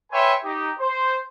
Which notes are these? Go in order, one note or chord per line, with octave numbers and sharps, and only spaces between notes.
B4 C#5 E5 G5 G#5 C6
D#4 G4
C5